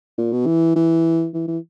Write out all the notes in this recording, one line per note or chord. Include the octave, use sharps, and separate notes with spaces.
A#2
B2
E3
E3
E3
E3